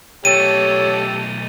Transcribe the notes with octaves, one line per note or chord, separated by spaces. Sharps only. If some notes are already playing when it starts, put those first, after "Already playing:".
B1 A3 G4 A4 C#5 D#7